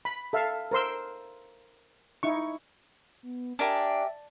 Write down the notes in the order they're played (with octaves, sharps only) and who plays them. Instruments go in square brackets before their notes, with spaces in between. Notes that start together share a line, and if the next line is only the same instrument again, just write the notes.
[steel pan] B5
A4 E5 F5
A#4 C5 C6 E6
D#4 E4 C#6
[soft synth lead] B3
[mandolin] D4 [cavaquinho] G4 A#4 G#5 [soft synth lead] E5